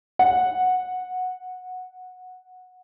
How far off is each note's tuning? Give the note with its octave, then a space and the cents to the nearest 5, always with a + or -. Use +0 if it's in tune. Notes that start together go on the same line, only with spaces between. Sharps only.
F#5 -10